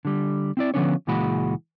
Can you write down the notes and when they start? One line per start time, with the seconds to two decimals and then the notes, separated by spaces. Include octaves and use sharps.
0.05 D3 G3
0.57 C4 E4 D5
0.74 D3 F3 B3 C#4 D4 C#5
1.07 C#2 A#2 E3 G#3 F#4 B5